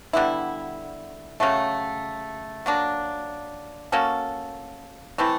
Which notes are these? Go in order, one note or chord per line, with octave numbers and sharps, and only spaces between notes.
D3 G3 B3 E4
C#3 F#3 A3
F#3 A#3 D4
A#3 C#4 F#4 A4
E3 A3 C4 E4